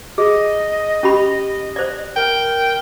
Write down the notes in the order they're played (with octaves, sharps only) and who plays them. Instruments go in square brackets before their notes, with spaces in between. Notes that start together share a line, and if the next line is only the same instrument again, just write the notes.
[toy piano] G#4 [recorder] D#5
[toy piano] C#4 G4 B5
C5 D5
[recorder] A#4 [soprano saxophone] G5